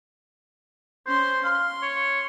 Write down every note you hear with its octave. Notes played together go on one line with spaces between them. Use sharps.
C#4 C5 C6
F5 C6
C#5